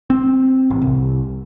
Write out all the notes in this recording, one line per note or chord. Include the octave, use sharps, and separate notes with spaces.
C4
A1
C2